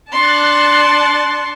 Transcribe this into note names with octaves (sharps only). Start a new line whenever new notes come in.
D4 A5 C6 C#6 F#6 A6